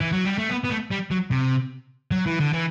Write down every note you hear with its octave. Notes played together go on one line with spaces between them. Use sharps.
E3
F#3
G3
A3
B3
B3
A3
G3
F#3
C3
F#3
E3
D3
E3